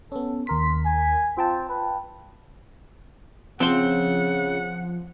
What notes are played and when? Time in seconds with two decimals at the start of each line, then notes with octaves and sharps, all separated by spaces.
0.12 B3 C#4 A4
0.47 D#2 A#4 C6 B6
0.85 G#5
1.37 C4 F4 G5 A5
1.69 B4
3.60 C#3 F3 C4 C5 F#5